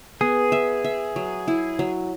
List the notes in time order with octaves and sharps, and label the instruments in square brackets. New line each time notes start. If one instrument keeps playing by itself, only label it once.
[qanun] B3 [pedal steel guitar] G#4
[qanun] E5
E5
F#3
E4
F#3